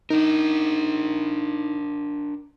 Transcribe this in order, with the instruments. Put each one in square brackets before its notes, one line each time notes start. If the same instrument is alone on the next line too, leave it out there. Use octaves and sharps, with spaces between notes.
[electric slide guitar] D4 A#4 [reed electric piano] D#4